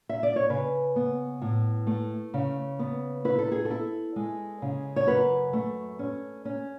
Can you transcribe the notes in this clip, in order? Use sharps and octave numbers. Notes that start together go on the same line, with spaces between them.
E5
D5
C#5
C#3 B4
B3
A2
A3
C#3
B3
E4 B4
A4
G#4
A4
E4
G#3
C#3
C#5
F#2 B4
A3
C#4
C#4